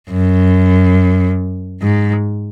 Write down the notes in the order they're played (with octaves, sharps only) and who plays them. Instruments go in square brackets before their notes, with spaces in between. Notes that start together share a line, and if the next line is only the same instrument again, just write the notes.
[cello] F#2
G#2